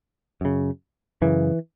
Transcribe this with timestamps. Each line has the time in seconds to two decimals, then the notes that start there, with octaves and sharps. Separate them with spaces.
0.41 F#2 C#3
1.22 F#2 C#3 E3